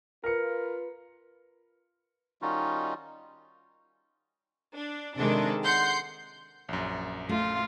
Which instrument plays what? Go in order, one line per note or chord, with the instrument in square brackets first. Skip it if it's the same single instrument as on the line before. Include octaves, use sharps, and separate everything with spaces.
[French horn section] F4 B4 [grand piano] A#4 C#7
[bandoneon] D#3 G3 C#4 D#4 F4 F#4
[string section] D4
C3 D#3 G#3 D4 A4
F#5 C6 G6
[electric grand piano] A#1 F#2
[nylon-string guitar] A3 [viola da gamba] F4